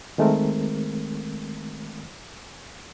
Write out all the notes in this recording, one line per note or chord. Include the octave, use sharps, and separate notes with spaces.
D#3 G#3 A3 C4 A#4